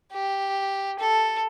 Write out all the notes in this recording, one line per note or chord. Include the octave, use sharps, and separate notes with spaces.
G4
A4